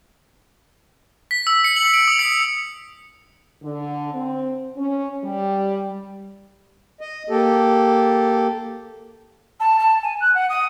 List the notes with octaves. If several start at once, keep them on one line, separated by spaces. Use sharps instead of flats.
B6
E6
C#7
F#7
D7
D#6
C#7
D3
C4
C#4
G3
D#5
A#3 G4 A4
A5
A5
G#5
F#6
F#5
D#6